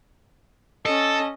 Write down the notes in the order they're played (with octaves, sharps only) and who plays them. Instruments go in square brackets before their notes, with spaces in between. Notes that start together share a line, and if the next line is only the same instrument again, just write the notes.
[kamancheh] C#4 D#5 [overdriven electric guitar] A4